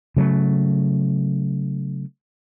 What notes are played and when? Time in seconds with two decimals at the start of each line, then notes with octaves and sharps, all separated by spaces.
0.17 C#3 F#3 A3